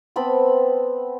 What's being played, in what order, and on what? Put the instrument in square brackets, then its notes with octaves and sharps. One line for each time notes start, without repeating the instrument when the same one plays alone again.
[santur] B3 C4 A5 B5